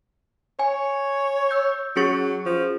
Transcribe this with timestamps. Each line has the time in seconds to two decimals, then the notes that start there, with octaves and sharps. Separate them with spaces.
0.59 C#5 G#5
1.51 E6 G6
1.96 F#3 C#4 G#4 C#6
2.46 F3